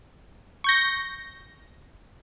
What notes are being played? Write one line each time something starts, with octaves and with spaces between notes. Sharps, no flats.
C#6 G6 A#6